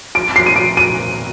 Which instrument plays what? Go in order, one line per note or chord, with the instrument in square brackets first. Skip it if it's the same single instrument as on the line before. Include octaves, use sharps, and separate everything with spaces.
[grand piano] D7
C7
D#7
D7
D#7